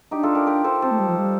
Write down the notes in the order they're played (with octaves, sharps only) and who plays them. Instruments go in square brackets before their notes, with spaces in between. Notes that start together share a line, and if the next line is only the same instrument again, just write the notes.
[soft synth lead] D4 [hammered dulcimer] D#4 G4
[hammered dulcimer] F4 A4
G4 A#4
G4 A#4
A4 C5
[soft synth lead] C4 [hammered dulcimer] A4 C5
[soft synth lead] A3
G3
F3
G3